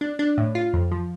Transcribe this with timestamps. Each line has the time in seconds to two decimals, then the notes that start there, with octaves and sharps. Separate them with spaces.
0.01 D4
0.19 D4
0.38 A2
0.55 F4
0.73 F2
0.92 F3